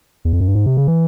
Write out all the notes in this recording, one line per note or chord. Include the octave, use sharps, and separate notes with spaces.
E2
F2
F#2
G2
G#2
C3
C#3
E3